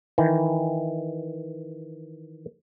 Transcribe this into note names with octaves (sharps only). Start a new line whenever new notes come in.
D#3 E3